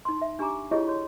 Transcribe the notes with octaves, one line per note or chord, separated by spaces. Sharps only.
D#4 C6
E5
D4 G4 G#5 A#5 D6
E4 F4 G4 G#4 C#5 D#5
F#4 C#5